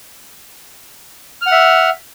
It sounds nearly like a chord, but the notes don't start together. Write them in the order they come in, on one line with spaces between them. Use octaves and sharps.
F6 F#5 E5